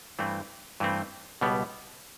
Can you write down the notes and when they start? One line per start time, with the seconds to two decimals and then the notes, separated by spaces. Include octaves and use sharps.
0.19 G2 E3 A3 C4
0.80 G2 E3 A3 C4
1.41 C#2 B2 G3 B3